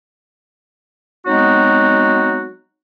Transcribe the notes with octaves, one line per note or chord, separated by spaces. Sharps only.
F#3 G#3 B3 C4 D#4 F#4